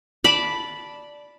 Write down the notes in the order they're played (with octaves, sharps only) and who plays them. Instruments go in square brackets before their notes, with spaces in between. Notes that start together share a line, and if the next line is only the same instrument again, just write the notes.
[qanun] D5 A5 B5